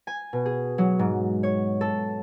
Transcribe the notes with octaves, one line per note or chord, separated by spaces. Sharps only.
G#5
B2
G#4
F#3
G#2
C#5
A4